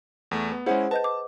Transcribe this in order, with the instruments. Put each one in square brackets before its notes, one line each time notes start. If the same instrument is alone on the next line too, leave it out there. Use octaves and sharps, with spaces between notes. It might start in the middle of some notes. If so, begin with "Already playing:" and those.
[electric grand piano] E2 A3
B3
[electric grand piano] G#3 C#4 E4 [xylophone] G#4 C5 F#5
[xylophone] B4 D#5 G6 [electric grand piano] A5
[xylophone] D6